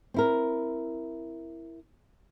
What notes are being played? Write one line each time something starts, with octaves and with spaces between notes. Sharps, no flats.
C4 E4 A#4